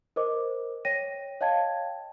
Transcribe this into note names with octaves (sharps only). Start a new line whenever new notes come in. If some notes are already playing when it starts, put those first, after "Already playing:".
A#4 C5 D#5 D6
C#5 G5 A#6 D#7
C#5 D#5 F5 G5 A5 G#6